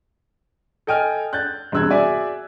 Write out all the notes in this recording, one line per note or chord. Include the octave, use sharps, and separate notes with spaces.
A4 D#5 G5 G#5 F6
F#6 G6 A6
E1 G2 C3 E6 F#6 G#6
F#4 G#4 D5 E5 G#5